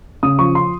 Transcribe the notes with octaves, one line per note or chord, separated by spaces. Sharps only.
C#3 D#6
F3 C#6
C6